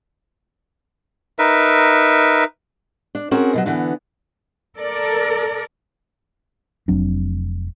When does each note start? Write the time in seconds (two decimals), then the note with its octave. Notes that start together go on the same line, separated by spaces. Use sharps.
1.39 D#4 A#4 B4 E5
3.15 D4
3.31 C4 C#4 F#4 G#4 A#4
3.53 B2 E3 F#3
3.66 D3 E3 B3
4.77 A4 A#4 D5
6.88 F1 F#3 C4 D4